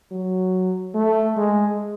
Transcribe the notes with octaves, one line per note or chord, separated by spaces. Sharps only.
F#3
A3
G#3